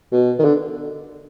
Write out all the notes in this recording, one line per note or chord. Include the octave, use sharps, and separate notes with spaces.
B2
D#3
D3